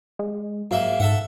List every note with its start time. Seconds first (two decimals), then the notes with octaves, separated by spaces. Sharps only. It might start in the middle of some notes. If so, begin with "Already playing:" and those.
0.19 G#3
0.71 G#2 F#3 A#3 E5
1.00 G#2 A4 E5 F#5